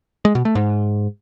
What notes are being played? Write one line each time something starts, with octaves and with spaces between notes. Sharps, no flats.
G#3
B2
A3
G#2